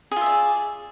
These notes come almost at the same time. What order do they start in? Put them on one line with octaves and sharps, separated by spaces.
G#4 F4 E5 D5